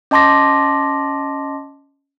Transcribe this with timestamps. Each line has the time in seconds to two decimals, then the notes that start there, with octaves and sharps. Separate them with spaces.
0.11 C#4 D#5 A5 C6 D6 A#6